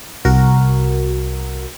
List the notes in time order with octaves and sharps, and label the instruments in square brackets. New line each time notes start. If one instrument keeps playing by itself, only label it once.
[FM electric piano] C2 F#4 A#4